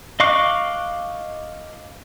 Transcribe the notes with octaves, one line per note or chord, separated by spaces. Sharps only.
D#5 F5 C#6 D6 F#6